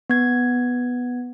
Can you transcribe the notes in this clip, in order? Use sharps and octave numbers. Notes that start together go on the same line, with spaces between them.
B3 G#6